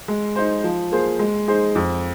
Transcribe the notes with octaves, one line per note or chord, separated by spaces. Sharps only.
G#3
D#4 C5
F3
A#3 G#4 C5
G#3
D#4 G#4 C5
F2